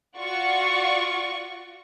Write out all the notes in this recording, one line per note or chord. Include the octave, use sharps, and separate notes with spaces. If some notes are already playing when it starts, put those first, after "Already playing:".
F4 F#4 D5 C#6